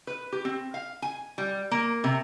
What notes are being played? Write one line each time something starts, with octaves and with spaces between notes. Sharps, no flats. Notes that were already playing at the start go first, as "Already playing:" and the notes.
B4
G4
C4
F5
G#5
G3
A#3
C3